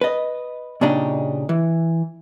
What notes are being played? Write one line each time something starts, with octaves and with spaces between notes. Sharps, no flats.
B4 D#5
A#2 C#3 D4 D#4 G4
E3